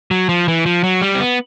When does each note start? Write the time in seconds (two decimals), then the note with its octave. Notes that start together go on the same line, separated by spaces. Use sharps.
0.11 F#3
0.29 F3
0.48 E3
0.66 F3
0.84 F#3
1.02 G3
1.15 C4
1.20 B3